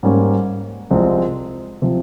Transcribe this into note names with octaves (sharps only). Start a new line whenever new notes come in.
G#2 G3 A#3 C#4
C2 C3 F3 G#3 C4
C3 F3